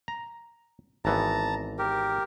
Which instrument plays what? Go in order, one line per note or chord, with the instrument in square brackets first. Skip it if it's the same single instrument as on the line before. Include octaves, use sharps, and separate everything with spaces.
[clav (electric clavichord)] A#5
[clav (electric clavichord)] G#1 E3 B3 [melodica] A5 A#5
[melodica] G4 A#4